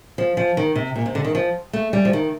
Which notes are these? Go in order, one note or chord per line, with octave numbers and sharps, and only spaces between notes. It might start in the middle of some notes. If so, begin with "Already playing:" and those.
F3
F3
D#3
C3
A#2
C3
D3
D#3
F3
A3
G3
F3
D#3